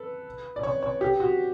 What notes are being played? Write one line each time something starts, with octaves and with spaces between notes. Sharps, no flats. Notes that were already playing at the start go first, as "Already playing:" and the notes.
Already playing: A4 B4
D5
C#5
C#5
G4
F#4